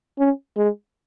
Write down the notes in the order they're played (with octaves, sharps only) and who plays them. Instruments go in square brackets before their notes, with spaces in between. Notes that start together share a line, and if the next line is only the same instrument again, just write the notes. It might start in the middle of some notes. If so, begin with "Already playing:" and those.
[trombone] C#4
G#3